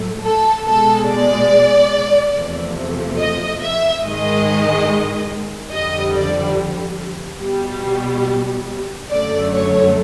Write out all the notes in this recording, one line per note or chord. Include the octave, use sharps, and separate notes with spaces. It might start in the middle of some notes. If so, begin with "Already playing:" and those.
Already playing: A2 F#3 A3
A4
B2 G#3 A4
D5
E2 C3 F3 A3
D#5
E5
G#2 D#3 G#3 D#5
F2 D3 G3 D#5
D5
B2 G3
F#2 D3 F#3 A3 D5
C#5